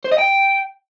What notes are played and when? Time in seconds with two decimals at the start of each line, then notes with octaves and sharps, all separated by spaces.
0.05 C5
0.12 D#5
0.19 G5